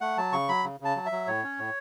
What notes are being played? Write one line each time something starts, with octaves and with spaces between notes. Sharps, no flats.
A3 F#5
F#3 A5
C#3 C#6
F#3 B5
C#3
C#3 A5
F#3
E5
F#3
A2 C#5
C#4
A2